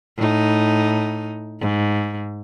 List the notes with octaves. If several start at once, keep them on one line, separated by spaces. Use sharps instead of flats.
A2 D#4
G#2